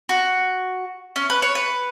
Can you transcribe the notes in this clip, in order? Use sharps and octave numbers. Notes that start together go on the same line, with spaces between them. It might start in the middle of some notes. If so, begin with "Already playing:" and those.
F#4
C#4
B4
C#5
B4